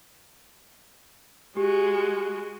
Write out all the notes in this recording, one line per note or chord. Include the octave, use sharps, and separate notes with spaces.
G#3 F#4 G4